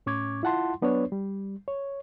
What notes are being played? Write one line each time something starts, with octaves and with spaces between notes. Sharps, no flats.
A2 C#4 C#6 D6 G#6
E4 F4 F#5 A5 C6
F#3 B3 D4 B4 C#5
G3
C#5